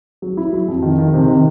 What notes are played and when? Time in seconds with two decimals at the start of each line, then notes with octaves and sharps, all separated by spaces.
0.22 F#3
0.37 E4
0.53 F#3
0.68 F2
0.82 D#3
0.98 D#3
1.14 C3
1.28 D#3